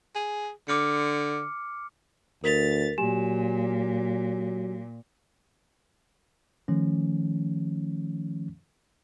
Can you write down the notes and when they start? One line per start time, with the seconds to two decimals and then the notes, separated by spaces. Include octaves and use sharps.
0.16 G#4
0.68 D3 D6 F6 C#7
2.44 D2 A#4 A6 B6 F7
2.98 A#2 F#3 G4 G#5 E7
6.68 D#3 F3 A3 C#4